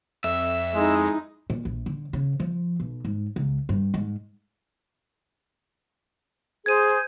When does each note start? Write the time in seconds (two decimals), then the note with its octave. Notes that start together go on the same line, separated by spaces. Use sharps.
0.24 F2 E5
0.75 G#3 D#4 E4
1.50 A#2
1.65 A#1
1.86 D3
2.13 C#3
2.40 F3
2.80 B1
3.05 G#2
3.36 C#2
3.69 G2
3.94 G#2
6.66 G#4 C5 G#6 D#7